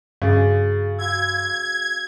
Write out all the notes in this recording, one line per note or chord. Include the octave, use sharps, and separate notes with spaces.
G2 C#3 F#4 G#4 A6
F#4 F5 E6 G#6